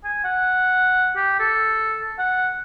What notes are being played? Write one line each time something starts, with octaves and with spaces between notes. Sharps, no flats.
G#5
F#5
G4
A4
F#5